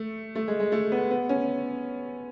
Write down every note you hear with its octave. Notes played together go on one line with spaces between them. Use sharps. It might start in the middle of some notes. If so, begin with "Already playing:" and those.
Already playing: A3
A3
G#3
G#3
A3
B3
B3
C#4